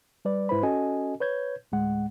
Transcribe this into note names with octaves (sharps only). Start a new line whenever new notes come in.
G3 B4 D5
G#2 E4 B4 C5 B5
C#4 F#4 A4 D#5 G#5
B4 C#5 G6 G#6
D2 A2 G#3 F#5